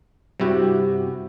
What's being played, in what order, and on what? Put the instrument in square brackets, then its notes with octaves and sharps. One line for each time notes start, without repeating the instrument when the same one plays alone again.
[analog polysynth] G2 F#4 G4 [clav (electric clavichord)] C3 E4